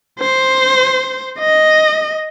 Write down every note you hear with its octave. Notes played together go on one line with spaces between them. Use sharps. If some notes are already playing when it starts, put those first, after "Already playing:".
C5
D#5